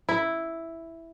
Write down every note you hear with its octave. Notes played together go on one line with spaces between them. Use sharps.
E4